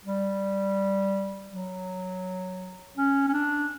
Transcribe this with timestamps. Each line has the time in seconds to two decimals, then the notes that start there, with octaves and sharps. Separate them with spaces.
0.05 G3
1.51 F#3
2.97 C#4
3.29 C#4
3.33 D4